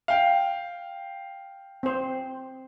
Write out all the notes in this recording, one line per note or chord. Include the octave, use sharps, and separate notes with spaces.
F5 G5
C4 C5